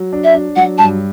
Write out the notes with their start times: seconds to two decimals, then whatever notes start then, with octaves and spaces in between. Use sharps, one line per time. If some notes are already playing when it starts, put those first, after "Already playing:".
Already playing: F#3
0.13 D4
0.24 E5
0.34 D4
0.56 F#3 F#5
0.78 G2 A5